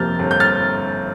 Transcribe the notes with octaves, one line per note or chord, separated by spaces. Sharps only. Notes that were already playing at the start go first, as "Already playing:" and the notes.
Already playing: G1 F2 C3 F3 A#3 F6 G6 A6
G1
G6
F6 A6